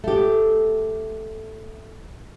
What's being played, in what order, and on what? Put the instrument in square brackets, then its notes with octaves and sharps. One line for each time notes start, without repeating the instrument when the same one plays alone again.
[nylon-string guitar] A3 G4